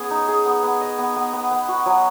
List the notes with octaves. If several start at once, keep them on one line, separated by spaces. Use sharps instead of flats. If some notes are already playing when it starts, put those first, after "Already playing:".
Already playing: B3 C#4 G#4 B4
D#4
G#4
B3
B3
D#5
B3
B3
B3
B3
F#4
F#3